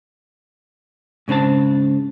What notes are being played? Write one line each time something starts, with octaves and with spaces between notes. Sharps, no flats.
G#2 C#3 C4 D4 A5